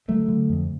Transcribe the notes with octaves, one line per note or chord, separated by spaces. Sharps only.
D3 F#3 A3
D3
F2